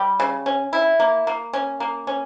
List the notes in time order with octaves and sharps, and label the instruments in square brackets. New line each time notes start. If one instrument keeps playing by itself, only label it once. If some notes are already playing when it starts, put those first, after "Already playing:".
Already playing: [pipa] G3
C#3
C#4
E4
A#3
A#3
C#4
A#3
C#4